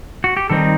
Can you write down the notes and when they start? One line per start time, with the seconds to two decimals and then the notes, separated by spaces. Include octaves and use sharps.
0.24 F#4
0.37 G4
0.50 D#3 G3 C4 D#4 A4